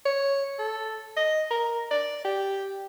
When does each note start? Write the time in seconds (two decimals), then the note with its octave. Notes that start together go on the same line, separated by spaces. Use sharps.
0.06 C#5
0.59 A4
1.17 D#5
1.51 A#4
1.91 D5
2.25 G4